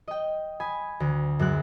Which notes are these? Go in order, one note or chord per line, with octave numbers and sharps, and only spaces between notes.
D#5 G5
G#5 B5 D#6
D2
F#2 G#3 F#6